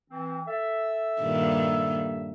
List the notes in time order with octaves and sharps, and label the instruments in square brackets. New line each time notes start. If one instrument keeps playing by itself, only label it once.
[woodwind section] E3 C4
A4 E5
[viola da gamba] G2 A#2 D#3